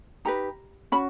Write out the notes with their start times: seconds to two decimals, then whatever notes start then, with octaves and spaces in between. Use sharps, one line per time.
0.25 D#4 G4 B4 A#5
0.92 C#4 F#4 B5